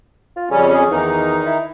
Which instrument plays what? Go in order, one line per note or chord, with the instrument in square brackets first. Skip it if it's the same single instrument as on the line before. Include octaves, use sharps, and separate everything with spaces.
[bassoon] F4
[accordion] F2 G3 C#4 [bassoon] C#3
[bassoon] G#4
[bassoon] E2 [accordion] D#3 D#4
[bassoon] E4